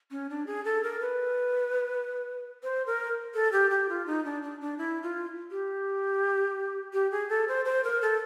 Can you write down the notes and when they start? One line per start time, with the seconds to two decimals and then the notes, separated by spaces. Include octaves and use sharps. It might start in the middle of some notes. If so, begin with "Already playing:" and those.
0.11 C#4
0.30 D4
0.47 G#4
0.65 A4
0.83 A#4
1.01 B4
2.63 C5
2.87 A#4
3.34 A4
3.52 G4
3.70 G4
3.89 F4
4.07 D#4
4.25 D4
4.43 D4
4.61 D4
4.78 E4
5.03 F4
5.51 G4
6.93 G4
7.11 G#4
7.29 A4
7.48 C5
7.65 C5
7.84 A#4
8.02 A4